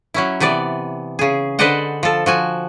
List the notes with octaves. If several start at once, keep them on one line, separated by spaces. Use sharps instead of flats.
F#3 C#4 E4
C3 E3 B3 D5
C#3 G#4
D3 B4 C5 D5 D#5 F#5
F3 A4
F3 F#4 G#5